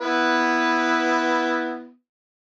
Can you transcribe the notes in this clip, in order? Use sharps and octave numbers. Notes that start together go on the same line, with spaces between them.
B3 E4 B4